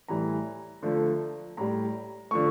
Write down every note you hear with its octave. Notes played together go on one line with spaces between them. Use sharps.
A2 E3 G3 A#5
D3 F3 A3
A2 G3 A#5
D3 F3 A3 C#6